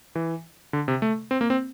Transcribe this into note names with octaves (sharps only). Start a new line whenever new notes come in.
E3
D3
C3
A3
C4
A#3
C4